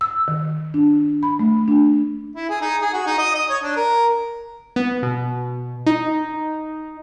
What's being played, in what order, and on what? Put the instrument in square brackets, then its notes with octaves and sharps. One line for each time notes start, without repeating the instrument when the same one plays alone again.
[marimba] E6
D#3
D4
B5
A3
D4
[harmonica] E4
G#4
D#4
G#4
F#4
D#4
D#5
D#5
C#5
D4
A#4
[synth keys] B3
B2
D#4